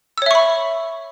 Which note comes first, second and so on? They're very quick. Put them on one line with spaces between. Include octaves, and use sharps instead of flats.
E6 C#5 E5 C#6 B5